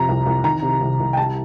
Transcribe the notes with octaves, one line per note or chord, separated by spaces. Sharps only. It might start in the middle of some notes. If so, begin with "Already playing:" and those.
Already playing: F2 C3 F3 A#5
C2
C2
D#3 A#5
C3
C2
C2
G5
G3 A5